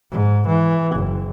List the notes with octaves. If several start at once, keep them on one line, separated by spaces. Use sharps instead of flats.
G#2
E3
F#1